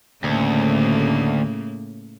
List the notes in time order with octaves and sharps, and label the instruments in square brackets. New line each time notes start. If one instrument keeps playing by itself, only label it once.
[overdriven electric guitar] D2 [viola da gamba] A2 C#3 A#3